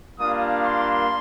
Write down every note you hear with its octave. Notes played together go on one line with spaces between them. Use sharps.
G3 A#3 D4 F4 D#6
C6